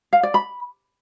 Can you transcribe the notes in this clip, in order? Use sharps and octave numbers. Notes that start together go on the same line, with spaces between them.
F5
D5
B5